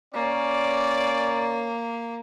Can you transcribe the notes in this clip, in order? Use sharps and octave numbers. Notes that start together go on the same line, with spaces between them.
A#3 C#4 D5